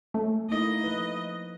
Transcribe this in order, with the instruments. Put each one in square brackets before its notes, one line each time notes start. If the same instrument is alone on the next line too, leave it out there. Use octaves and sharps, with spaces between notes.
[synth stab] A3 [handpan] C#4
[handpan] A#3 D#4 E4 [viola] D#5
[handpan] F3 B4